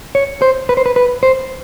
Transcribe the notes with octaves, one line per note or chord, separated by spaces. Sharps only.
C#5
C5
B4
C5
B4
B4
C5